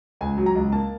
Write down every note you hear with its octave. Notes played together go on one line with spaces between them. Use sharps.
C#2 G#5
F#3
A#5
C#2
A#3 A5